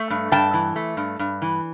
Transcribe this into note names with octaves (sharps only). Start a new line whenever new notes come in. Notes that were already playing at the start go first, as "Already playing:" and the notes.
Already playing: A3
G2
G2 G5 A5
E3
A3
G2
G2
E3